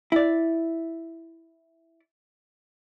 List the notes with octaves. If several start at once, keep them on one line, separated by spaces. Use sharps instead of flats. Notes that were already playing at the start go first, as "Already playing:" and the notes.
E4 D5